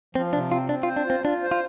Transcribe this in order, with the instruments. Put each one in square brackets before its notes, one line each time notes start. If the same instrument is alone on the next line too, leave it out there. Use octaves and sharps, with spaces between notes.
[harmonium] F3 [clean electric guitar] C4
[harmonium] C3 [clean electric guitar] D4
[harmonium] C4 [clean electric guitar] F4
[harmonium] C4 [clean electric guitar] D4
[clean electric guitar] F4
[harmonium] C5
[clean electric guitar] D4
[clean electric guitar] C4 [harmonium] F4
[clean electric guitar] D4 [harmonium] F4
[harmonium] C5
[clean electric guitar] F4